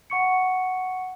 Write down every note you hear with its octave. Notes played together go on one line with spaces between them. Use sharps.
F#5 C#6 C#7